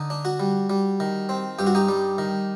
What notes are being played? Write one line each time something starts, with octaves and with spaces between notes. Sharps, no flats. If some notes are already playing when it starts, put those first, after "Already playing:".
Already playing: D3 D#4
D4
F#4
G3
G3
D#3
C4
G2 G4
F#4
D#4 G4
G3
D#3